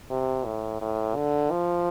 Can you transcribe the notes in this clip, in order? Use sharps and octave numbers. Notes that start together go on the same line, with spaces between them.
C3
A2
A2
D3
F3